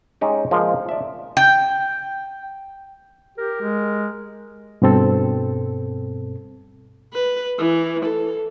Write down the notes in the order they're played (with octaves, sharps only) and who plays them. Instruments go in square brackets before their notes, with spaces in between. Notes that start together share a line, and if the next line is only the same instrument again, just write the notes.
[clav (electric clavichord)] G#3 C#4 D#4 G4
F3 G#3 A#3
D5 E5
[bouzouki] G5
[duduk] G4 [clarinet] A#4
[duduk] G#3
[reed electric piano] G2 B2 C4 A4
[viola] B4
E3
A4